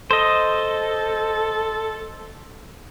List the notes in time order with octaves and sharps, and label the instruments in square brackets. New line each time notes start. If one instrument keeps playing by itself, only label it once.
[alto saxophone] A4 [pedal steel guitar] C5 D#5